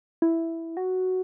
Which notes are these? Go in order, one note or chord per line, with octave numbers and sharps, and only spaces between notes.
E4
F#4